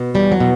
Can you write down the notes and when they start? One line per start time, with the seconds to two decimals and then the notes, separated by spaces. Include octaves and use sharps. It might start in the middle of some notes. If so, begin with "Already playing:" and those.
Already playing: B2
0.14 E2 G3
0.32 F#3
0.40 B2